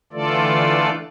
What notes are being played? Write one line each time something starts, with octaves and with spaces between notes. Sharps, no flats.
D3 E3 A3 F4 A4 D5